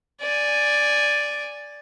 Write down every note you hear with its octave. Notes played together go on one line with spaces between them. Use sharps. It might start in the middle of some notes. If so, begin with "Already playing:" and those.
D5 G#5